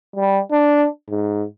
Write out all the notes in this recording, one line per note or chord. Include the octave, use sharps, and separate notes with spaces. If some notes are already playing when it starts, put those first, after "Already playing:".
G3
D4
G#2